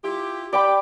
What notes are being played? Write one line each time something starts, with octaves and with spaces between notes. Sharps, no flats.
E4 F4 G4
G4 D5 G5 B5